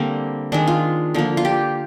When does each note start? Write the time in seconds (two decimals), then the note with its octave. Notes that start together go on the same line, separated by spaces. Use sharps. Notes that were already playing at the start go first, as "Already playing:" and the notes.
Already playing: D3 G3 A#3 C4
0.52 D#3 G#3 D4
0.67 F4
1.14 D3 F3 A#3
1.37 F4
1.45 G4